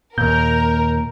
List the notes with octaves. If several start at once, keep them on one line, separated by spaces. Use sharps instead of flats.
D#2 A#2 A#4 G6